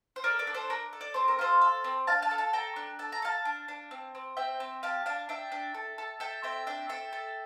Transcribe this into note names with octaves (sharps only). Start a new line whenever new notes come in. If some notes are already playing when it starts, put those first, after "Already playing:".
C5
A4 A#4 D5
A#4 D5
D4
A4 C5
D4 A#4
A4
D5
C4 C5
A#4
F4 A4 C5
A4
C4
D4 F5 A5
F5 A5
A4
F5 A5
A4 G5 A#5
D4
A4 A5
A#5
A4 F5 A5
D4
D4
C4
C4
C4 E5 G5
C4
G4 F5 A5
D4 F5 A5
D4 E5 G5
D4
A4
A4
A4 E5 G5
C4 E5 G5
D4 E5 G5
A4 E5 G5
A4